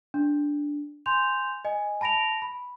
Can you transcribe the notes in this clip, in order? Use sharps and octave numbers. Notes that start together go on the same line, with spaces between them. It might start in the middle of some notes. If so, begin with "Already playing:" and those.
D4
G#5 C6 G6 F7
D#5 G#5
A5 B5 A#6 D7 F7
B5